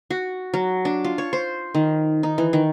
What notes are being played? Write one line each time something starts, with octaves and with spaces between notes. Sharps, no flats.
F#4
F#3
D4
F4
C#5
C5
D#3
D#4
E3
D#3